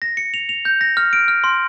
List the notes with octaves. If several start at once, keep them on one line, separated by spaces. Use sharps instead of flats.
A#6
C#7
F7
F7
G6
A#6
F6
D7
F6
C6